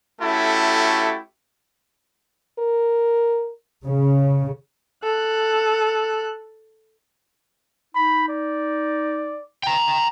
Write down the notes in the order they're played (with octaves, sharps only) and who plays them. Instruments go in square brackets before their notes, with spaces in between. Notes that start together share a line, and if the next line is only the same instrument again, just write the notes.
[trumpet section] A3 C#4 E4 F#4 G4 A4
[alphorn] A#4
[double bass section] C#3
[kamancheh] A4 F#6
[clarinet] D#4 [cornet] B5
[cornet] D5
[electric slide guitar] G5 A#5